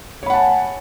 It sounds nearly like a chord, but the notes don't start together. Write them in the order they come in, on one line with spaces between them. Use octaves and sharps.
C#5 B5 F#5 A5 G#5